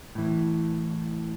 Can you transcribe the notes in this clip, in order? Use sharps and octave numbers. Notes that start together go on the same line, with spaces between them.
A2 E3